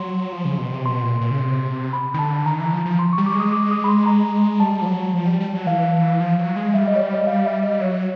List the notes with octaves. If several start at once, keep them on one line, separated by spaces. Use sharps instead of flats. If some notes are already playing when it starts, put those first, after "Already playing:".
Already playing: F#3 C6
F3
C#3
B2
C3
B2 C6
A#2
A#2
C#3
C3
B5
D#3
D3 A5
D#3 A#5
E3
F3
F3
C6
C#6
G3
D6
G#3
D#6
D6
D#6
B5
C6
A#5
G3 A5
F3
F#3
F3
G3
G3
F#3
E3 F5
F3
F#3
G#3
G3 E5
D#5
C#5
D5
D#5
F5
E5
D#5
F#3 C#5